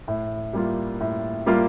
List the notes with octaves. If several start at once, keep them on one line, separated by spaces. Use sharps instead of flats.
A2
G3 A#3 F4
A2
G3 A#3 F4